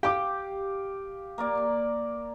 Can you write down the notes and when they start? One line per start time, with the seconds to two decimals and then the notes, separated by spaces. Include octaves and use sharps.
0.03 G4 F5 D6
1.38 A#3 A#4 D5